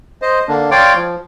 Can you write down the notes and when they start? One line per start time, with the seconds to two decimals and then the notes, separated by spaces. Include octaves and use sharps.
0.22 C5 D#5
0.48 D3 A#3 D4
0.71 C#5 D5 F5 G5 C6 D6
0.94 F3